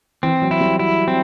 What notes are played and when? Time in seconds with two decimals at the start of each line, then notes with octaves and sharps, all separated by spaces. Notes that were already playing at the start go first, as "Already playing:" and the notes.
0.23 E3 C4
0.42 F#3
0.51 E4
0.61 G3
0.79 E4 F#4
1.08 C4